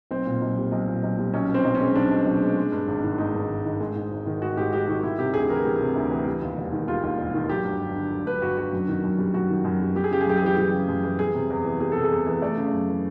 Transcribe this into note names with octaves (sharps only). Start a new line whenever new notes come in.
B1 C4
A#2
B1
G3
B1
A#2
B1
G3
B1 C#4
B2
C4
B1
C#4
G#3
B1 D4
B2
B1
G#3
G#3
G2
G#1
D#3
G#3 D#4
G2
G#1
D#3
G#3
G#2
G#1
D#3
G#3 F#4
G#2 G4
G#1 G4
D#3 F#4
G3 E4
C3 G4
D2 G#4
E3 A#4
G3
C3
D2
E3
G3
D#2
E1
D#3
G3 F4
D#2
E1
D#3
F#3 G4
G2
G1
D3
F#3
G2 B4
G1 F#4
D3 F#4
F#2
D#3
F#2
G3
F#2 F#4
D#3
F#2
G3
G3 G4
G#4
C#3 G4
G#4
F#2 G4
G#4
E3 G4
G3 G4
C#3
F#2
E3
G3 G#4
C3
E2
E3
G3 G#4
C3 A4
G#4
E2
E3
A3 D5
C#3
F#2
E3